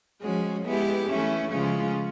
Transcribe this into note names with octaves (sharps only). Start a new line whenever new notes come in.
F3 G#3 C#4 F#4
G#3 B3 E4 G4
E3 A3 C#4 E4
C#3 F3 G#3 C#4 F4